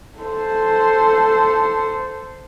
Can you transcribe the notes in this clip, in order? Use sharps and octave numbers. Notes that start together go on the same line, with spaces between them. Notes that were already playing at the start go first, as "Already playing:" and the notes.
A4 C5